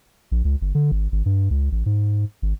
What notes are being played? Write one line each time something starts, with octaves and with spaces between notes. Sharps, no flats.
A#1
C#2
G1
D3
G#1
G#1
G2
C#2
A1
G#2
G#1